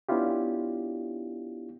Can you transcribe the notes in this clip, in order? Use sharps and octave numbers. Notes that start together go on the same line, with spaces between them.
B3 C#4 D4 E4 F4 G4